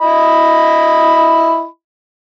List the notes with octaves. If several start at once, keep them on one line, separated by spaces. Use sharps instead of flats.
E4 D#5 B5